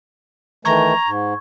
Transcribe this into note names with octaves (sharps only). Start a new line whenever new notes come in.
D#3 E3 A3 A#5 C#6 G#6
G#2